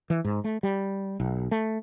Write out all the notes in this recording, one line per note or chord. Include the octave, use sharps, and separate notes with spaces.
E3
G#2
A3
G3
B1
A3